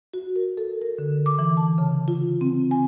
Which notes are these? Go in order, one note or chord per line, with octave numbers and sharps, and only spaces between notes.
F#4
A#4
A4
A#4
D3
D6
E3
A5
C#3
F4
C4
G#5